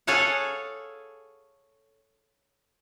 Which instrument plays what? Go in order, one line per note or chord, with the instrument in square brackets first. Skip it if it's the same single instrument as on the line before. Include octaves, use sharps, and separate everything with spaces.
[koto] G#4 A4 C#5 F5 F#5